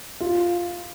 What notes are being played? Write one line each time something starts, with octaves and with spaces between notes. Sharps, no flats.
F4